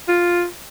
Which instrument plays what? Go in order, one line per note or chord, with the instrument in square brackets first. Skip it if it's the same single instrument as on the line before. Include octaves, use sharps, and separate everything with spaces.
[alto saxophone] F4